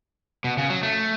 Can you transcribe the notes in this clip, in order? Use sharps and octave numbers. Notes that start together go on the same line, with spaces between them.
B2
C#3
F#3
A3